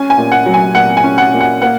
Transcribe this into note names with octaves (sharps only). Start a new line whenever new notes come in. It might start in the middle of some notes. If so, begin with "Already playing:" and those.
Already playing: C#4 G#5
G#5
A#2
F#5
F#3
G#5
A#2 F#5
G#5
C#4
F#5
A#2
F#5
A#3 F#5